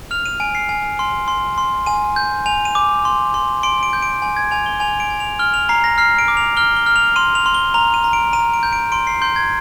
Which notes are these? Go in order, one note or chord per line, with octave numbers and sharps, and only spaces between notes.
F6 F7
D#7
G#5 D7
C7
G#5
C6
C6
C6
G#5 D#7
G6
G#5 F7
D#7
D6
C6
C6
C6 D7
D7
G6
D7
G#5
G#6
G#5 F7
G7
G#5 F7
D7
G#5
F7
F6 G7
F7
A#5 C7
A#6
F6 C7
D7
D6
F7
F6 G7
G7
F6
F7
C6 D#7
F7
C6
G7
A#5 F7
D#7
A#5
D7
A#5 D#7
D7
G6
D7
C6 D7
C7
C6 G6
G#6